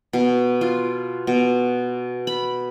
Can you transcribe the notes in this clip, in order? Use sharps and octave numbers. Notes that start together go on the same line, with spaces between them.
B2
F4
B2
B5